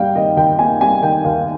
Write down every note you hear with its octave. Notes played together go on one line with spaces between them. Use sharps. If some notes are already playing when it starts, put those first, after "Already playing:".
Already playing: G3 A#3 F5 G5
D#3 D#5
D#2 G5
A#3 G#5
G3 G#5
D#3 G5
D#2 F5